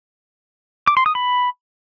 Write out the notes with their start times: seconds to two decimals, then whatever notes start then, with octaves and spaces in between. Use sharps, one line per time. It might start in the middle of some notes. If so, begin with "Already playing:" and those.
0.87 D6
0.97 C6
1.06 D#6
1.15 B5